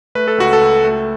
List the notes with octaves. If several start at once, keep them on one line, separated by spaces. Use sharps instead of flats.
A3 B4
A4
C#2 F#4
A4
C#2
A3